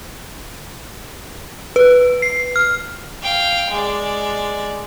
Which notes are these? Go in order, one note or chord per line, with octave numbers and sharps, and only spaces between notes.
B4
C7
F6
F5 G5
G#3 D5